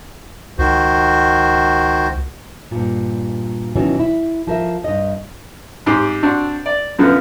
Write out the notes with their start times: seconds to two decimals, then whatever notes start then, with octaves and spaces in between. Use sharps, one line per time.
0.58 C#2 D#3 F#4 C5
2.71 G2 A#2
3.76 B2 D#3 E3 F#3 B3 C#4
3.99 E4
4.47 F3 A#4 E5
4.84 G2 D#5
5.86 G#2 C4 G4
6.23 C4 D4 F#4
6.66 D5
6.99 F#2 D3 F3 B3